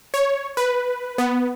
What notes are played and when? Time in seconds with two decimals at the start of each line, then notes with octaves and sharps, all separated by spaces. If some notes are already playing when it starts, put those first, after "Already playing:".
0.14 C#5
0.57 B4
1.18 B3